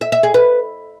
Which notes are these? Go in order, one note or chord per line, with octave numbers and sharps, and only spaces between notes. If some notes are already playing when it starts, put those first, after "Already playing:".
E5
E5
G#4
B4